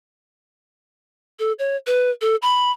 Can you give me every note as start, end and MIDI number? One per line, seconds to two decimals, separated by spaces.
1.39 1.52 69
1.59 1.76 73
1.87 2.10 71
2.21 2.36 69
2.42 2.71 83